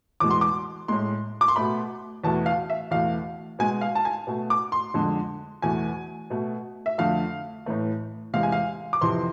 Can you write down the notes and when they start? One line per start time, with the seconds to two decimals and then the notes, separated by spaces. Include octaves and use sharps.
0.20 E2 B2 G#3 D6
0.31 C6
0.41 D6
0.88 A2 G#3 C6
1.41 D6
1.48 C6
1.56 B2 A3 B5
2.24 E2 B2 A3 A5
2.46 F5
2.70 E5
2.91 E2 B2 A3 F5
3.59 B2 G#3 G#5
3.81 F5
3.95 A5
4.05 G#5
4.27 B2 A3
4.50 D6
4.72 C6
4.94 F2 D3 G#3
5.62 E2 B2 A3 G#5
6.30 B2 A3
6.86 E5
6.98 F2 D3 A3 F5
7.66 A2 E3 A3
8.33 E2 C3 G#3 F5
8.43 G#5
8.52 F5
8.93 D6
9.01 F2 C3 E3 C6